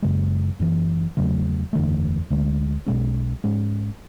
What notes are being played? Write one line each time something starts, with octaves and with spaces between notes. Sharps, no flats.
F#1 F#2 C#3 G#3
F#1 F#2 E3
E2 C#3 F#3 A3
F#1 E2 D3 A3
D2 D3 G#3
B1 B2 G#3 C#4
G#2 G#3 C#4